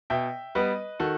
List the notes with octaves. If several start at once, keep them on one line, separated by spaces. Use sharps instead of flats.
B2 E5 G5
G3 B3 B4 D#5
D#3 F#4 A4